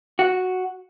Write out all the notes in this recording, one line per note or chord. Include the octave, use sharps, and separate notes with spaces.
F#4